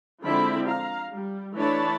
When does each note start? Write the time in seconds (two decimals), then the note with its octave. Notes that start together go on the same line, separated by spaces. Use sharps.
0.22 D3 F3 G#3 C4 E4 B5
0.67 F5 A#5
1.12 G3
1.55 E3 A3 D4 C#5 A5 B5